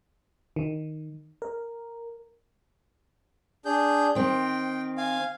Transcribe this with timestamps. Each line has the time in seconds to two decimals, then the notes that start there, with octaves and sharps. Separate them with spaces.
0.56 D#3
1.42 A#4
3.65 D4 G#4 G6
4.15 D#3 C4 G5
4.98 F5 G#5